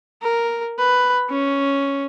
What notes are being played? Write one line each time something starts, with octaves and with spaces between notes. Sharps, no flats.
A#4
B4
C#4